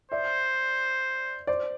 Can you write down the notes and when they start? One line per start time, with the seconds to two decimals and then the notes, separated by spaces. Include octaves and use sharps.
0.11 C5 D5 E5
1.47 C5 D5